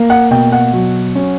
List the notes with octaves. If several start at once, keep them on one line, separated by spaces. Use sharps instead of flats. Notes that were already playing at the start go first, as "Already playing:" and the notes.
Already playing: A#3
F#5
B2 G5
F#5
F#3
C#4